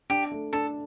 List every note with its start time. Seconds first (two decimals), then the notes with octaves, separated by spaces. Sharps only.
0.10 D4 G4
0.31 A3
0.53 D4 A4